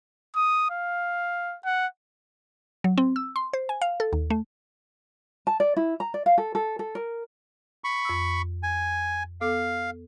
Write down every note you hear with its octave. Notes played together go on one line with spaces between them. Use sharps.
D#6
F5
F#5
F#3
C4
E6
C6
C5
G#5
F5
A4
D#2
A3
A5
D5
E4
A#5
D5
F5
A4
A4
A4
A#4
B5 C#6
F2 E6
G#5
B3 A4 F5 D6